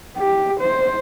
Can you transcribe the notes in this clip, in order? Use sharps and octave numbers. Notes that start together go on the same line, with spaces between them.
G4
C5